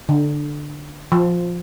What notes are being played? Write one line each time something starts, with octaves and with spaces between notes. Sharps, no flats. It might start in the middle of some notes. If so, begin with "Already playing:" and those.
D3
F3